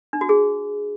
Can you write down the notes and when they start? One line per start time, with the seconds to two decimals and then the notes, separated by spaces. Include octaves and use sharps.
0.13 D4
0.21 F#4
0.29 G#4